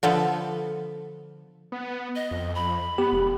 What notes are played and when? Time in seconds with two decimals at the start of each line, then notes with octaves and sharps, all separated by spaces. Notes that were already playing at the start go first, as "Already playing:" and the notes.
0.03 D3 F3 B3 A4
1.72 B3
2.16 D#5
2.31 F2
2.55 B5
2.98 B3 G4
3.13 E1